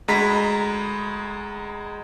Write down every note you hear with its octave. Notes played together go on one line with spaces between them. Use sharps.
D2 G#3 A#5 B5 B6